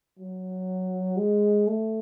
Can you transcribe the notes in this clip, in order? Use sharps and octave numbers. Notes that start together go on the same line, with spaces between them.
F#3
G#3
A3